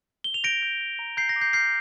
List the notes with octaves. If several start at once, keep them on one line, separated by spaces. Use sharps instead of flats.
G7
F7
G6 A#6 D7
G6
G6
A#5
A#5 G6 C7
A#6
D6
G6 C7
F6 G6 C7